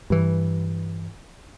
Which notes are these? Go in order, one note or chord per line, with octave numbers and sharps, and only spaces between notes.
G2 E3